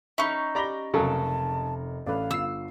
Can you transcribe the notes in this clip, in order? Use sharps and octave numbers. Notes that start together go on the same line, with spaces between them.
C#4 D#4 E5 B5 C#6
G4 D5 A#5 B5 A#6 G7
F1 C#3 F#3 A4 A#4 A5 A#5
A1 D4 A4 B4 F5
G1 F4 E6 C7